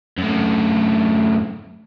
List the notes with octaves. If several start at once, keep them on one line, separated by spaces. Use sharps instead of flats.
F#2 A2